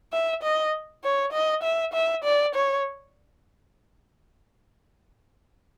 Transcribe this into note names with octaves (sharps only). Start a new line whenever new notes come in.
E5
D#5
C#5
D#5
E5
E5
D5
C#5